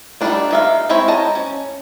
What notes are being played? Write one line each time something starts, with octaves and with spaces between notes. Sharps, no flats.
G3 A3 A#3 D4 D#4
D#3 E5 F5
G#3 C4 E4 C#5 E5
D#5 A5 A#5
C#4